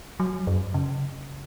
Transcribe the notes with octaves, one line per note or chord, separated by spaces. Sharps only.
F#3
F#2
C#3